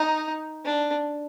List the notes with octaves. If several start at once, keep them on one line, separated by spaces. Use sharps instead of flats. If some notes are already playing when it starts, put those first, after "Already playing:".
Already playing: D#4
D4